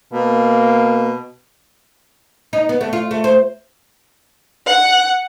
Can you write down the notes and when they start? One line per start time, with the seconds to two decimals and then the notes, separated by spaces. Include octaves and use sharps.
0.13 B2 A#3
2.53 D#4
2.69 B3
2.81 A3
2.93 F4
3.11 A3
3.24 C5
4.66 F#5